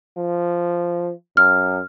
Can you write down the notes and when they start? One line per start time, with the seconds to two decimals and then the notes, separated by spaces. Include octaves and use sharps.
0.18 F3
1.37 F#2 F6